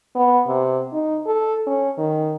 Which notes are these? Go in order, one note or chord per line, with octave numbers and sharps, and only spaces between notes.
B3
C3
D#4
A4
C#4
D#3